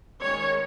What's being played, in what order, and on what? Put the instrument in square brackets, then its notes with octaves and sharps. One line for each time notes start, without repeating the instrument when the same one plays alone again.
[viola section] D#3 G#3 C#4 C#5